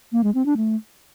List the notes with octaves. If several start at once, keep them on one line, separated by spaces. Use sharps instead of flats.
A#3
G#3
C4
D4
A3